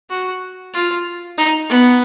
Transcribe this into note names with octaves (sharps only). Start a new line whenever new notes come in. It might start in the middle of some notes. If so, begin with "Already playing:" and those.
F#4
F4
D#4
B3